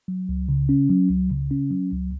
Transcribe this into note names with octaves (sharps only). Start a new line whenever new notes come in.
F#3
C#2
C#3
C#4
F#3
C#2
C#3
C#4
F#3
C#2